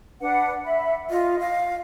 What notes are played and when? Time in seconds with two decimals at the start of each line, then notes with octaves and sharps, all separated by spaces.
0.21 D4 B4 F#5
0.65 E5 B5
1.10 F4 D#5
1.39 F5